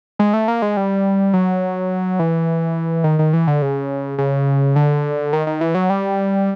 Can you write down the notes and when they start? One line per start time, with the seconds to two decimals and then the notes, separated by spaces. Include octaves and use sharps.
0.19 G#3
0.33 A3
0.48 A#3
0.62 G#3
0.77 G3
1.34 F#3
2.19 E3
3.04 D#3
3.19 D#3
3.33 E3
3.47 D3
3.62 C#3
4.18 C#3
4.76 D3
5.33 D#3
5.47 D#3
5.61 E3
5.75 F#3
5.90 G3